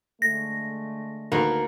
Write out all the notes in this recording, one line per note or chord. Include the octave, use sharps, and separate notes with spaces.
D3 G#3 A3 A#6
D2 D#3 A#3 B4